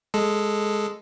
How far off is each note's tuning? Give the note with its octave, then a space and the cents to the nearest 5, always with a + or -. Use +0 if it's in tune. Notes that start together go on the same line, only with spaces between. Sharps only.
G#3 +0 A4 -5